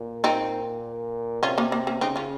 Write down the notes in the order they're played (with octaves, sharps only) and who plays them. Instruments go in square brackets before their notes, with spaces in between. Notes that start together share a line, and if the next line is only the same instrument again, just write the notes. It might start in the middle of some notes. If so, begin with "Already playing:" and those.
Already playing: [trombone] A#2
[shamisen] C4 D#4
[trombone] C3 [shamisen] C#4 F4
[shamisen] A#3 C#4
A#3
A#3 C#4
[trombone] C#3 [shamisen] C4 D#4
[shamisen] C#4 F4